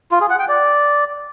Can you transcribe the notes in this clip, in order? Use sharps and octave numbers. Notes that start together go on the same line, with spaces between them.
F4
G#4
F#5
G5
D5